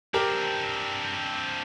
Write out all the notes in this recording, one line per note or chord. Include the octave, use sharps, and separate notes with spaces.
C4 D4 G4 A#4